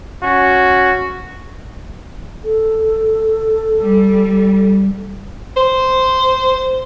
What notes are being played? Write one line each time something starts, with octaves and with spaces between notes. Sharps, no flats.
C#4 F#4
A4
G3
C5